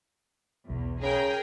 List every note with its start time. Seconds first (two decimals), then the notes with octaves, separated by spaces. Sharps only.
0.70 B1 E2
1.02 C#3 G#4 A#4 G5